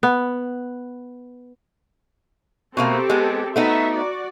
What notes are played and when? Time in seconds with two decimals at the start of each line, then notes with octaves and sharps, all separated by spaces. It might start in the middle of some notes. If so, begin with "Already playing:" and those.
0.03 B3
2.77 B2 A3 A#3 C4 G4 A4
3.09 G#3 B3
3.56 A3 B3 D#4 F#4 E5
3.94 F#4 D5